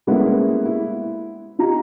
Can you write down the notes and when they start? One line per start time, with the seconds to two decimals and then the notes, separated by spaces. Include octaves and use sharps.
0.07 G3 G#3 A#3 B3 C#4 E4
0.65 E4
1.59 D#4 F4 G4 A#5